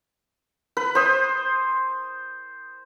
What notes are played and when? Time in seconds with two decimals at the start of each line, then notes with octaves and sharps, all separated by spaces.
0.77 B4
0.95 C5 D#6